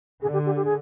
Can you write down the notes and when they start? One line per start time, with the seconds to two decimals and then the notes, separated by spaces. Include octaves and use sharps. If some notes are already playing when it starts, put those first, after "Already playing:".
0.22 D3 G#4
0.33 G4
0.46 G4
0.56 G4
0.65 G#4